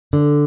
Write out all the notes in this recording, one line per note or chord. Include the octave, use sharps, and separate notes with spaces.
D3